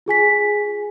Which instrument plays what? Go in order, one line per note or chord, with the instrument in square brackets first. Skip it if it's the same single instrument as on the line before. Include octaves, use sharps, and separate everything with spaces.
[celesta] F4 G#4 G#5 B6